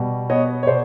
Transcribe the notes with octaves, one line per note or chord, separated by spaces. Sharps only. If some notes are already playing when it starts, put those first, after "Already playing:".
Already playing: B2 G3
B3 C#5 D#5
C#5
B2 C5 D5